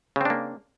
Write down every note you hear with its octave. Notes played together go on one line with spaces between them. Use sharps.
C#3 A#3 C4 D4